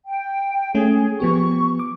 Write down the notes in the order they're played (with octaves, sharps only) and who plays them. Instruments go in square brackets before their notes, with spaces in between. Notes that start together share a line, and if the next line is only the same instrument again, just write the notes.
[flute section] G5
[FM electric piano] A3 C#4 [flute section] G#4
[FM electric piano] F3 B3 G4 [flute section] C#6
[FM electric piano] D6